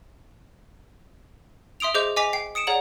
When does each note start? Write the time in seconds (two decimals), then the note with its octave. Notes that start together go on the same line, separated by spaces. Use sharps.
1.80 E5 C6 D#6 D7 F7
1.94 G#4 C5 D#5 D6 G6
2.16 D#5 G#5 D6 B6 F7
2.33 G5 C7
2.55 D#6 C#7 D7 E7
2.67 G#4 C#5 D5 F#5 A#5 F#7